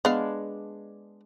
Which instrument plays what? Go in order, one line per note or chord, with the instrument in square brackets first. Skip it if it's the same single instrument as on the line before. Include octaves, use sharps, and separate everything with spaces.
[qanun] G#3 D4 [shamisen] B3 F5